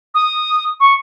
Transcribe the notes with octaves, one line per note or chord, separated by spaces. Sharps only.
D#6
C#6